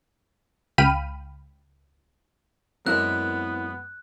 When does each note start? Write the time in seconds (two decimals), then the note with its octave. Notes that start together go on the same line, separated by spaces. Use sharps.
0.78 C#2 F5 G5 B5 F6 D#7
2.87 F#2 G#3 B3 C4 E4 A#4 F#6